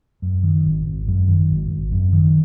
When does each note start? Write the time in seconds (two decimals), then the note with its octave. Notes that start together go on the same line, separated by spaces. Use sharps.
0.22 F#2
0.43 D#3
0.65 G#1
0.86 G#1
1.08 F#2
1.28 D#3
1.50 G#1
1.70 G#1
1.92 F#2
2.13 D#3